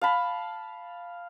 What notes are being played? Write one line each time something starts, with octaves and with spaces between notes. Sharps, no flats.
F5 A5 B5